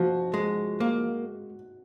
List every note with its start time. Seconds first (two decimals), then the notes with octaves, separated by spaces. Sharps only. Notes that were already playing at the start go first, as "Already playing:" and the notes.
Already playing: F3 F#4
0.34 G#3
0.80 A#3